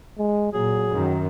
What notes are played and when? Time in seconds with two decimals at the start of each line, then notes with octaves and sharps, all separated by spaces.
0.19 G#3
0.53 A#2 F#3 G#4
0.90 F#2 D#3